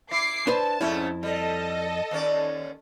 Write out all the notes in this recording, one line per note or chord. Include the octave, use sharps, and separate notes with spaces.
E4 D6 C7
D4 B4 C5 A5
F2 G#2 A3 C#4 E4
G3 A4 D#5
D#2 C#4 D5